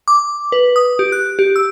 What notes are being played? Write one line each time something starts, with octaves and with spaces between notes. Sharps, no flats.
D6
B4
D#6
G4
F#6
G4
E6